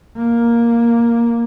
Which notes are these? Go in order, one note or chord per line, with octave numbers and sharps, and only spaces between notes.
A#3